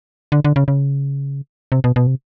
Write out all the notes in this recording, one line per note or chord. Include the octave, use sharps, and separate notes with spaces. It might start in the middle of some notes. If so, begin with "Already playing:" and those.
D3
D3
C#3
C#3
C3
B2
B2
C3